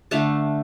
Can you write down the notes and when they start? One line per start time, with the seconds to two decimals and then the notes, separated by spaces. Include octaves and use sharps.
0.11 D3 A3 D4 F5 A5